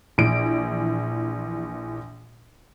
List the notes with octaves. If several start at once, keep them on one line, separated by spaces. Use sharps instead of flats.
A#1 E3 D7